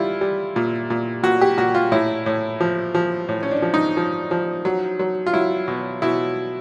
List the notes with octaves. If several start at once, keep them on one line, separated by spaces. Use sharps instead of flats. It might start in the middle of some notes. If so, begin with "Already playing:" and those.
Already playing: G3 E4 F4
G3
A#2
A#2
A#2 F#4
G4
A#2 F#4
F4
A2 E4
A2
F3
F3
A2
C#4
D4
F3
D#4
F3
F3
F#3
F#3
F4
F#3 E4
B2
B2 E4